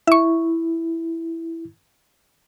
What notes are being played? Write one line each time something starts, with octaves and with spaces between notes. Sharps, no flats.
E4 E5 C#6